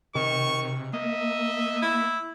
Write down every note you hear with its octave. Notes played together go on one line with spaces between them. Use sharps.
C3 D#3 C#6
A#3 D#5 E5
E4